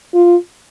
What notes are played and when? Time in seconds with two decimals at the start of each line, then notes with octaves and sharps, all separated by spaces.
0.14 F4